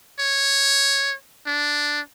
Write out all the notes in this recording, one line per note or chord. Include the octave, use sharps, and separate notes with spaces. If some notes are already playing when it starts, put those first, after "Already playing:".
C#5
D4